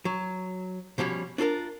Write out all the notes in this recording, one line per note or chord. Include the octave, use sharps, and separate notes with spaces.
F#3
B2 F3 G3 C#4
D4 F4 A4 A#4